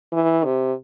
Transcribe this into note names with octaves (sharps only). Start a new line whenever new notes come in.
E3
C3